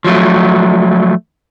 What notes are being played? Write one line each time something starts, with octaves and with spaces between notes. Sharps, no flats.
F3 F#3 A3